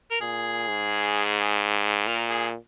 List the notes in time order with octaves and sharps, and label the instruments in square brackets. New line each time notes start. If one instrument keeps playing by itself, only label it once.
[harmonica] A#4
[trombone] A#2 [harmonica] G#4
[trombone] G#2
[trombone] A#2 [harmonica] A#4
[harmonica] G#4